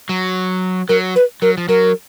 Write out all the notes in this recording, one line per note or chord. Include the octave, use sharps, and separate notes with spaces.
F#3
F#3 A#4
B4
F#3 A#4
F3
F#3 A#4